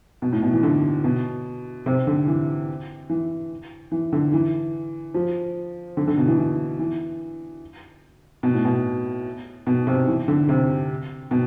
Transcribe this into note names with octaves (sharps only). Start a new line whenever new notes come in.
B2
A2
B2
E3
D3
B2
C3
D3
E3
E3
E3
D3
E3
F3
D3
D3
B2
E3
E3
E3
B2
A2
B2
B2
C3
E3
D3
C3
B2